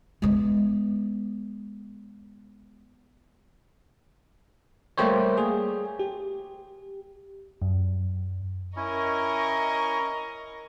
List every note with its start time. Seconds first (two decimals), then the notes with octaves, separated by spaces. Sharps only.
0.22 G#3 B3
4.98 G3 A3 A#3 G4 C5 C#5
5.38 G#4
5.99 G4
7.62 F#2
8.76 C#4 E4 A#4 D#5 C#6